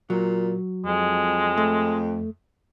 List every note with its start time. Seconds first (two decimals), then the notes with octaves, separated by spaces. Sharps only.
0.10 A#2 F#3
0.86 F2 G#3
1.57 A3